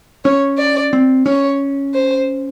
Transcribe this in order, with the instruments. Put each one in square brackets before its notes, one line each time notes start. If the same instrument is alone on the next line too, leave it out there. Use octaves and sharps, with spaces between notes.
[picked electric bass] C#4 [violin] C#5
[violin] D5
[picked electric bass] C4
[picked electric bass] C#4 [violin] C#5
[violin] C5